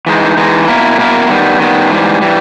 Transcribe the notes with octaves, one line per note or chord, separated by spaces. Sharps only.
E3 G#3 D#4
E3 G#3 D#4
B2 A#3 E4 A#4
B2 A#3 E4 A#4
D#3 G3 B3
D#3 G3 B3
G#2 E3 G3
E3 G3